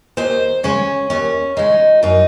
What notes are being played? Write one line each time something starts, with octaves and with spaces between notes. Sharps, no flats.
D#2 C5
C#3 G#3 C#4
D#2 C#4
C#3 G#3 D#4
F#2 D#4